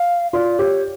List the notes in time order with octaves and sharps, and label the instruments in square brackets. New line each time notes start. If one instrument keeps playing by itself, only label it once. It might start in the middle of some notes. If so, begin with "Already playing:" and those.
Already playing: [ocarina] F5
[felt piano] F4 [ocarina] D5
[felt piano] G4 [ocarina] C#5